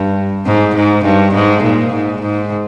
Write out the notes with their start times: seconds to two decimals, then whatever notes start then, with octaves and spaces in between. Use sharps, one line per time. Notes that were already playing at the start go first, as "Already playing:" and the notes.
Already playing: G2
0.46 G#2
0.75 G#2
1.05 G2
1.34 G#2
1.63 A#2
1.93 G#2
2.22 G#2